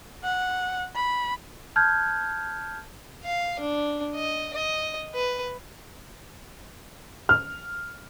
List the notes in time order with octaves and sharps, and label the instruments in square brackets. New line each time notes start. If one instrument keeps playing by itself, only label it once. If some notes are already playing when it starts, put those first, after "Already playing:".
[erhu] F#5
B5
[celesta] A5 F6 G6 G#6
[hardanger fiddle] F5
D4
D#5
D#5
B4
[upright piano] F6